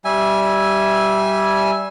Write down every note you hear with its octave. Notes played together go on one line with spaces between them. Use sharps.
G3 E5 G#5